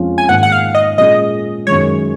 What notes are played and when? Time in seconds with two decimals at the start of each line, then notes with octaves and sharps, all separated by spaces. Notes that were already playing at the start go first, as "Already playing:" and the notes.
Already playing: F2 F3 G#3 C#4 F4
0.18 G#5
0.28 G#2 D#3 A#3 F#5
0.43 F#5
0.52 F5
0.75 D#5
0.98 A#2 G#3 C#4 G#4 D#5
1.67 F#2 D#3 G#3 C#5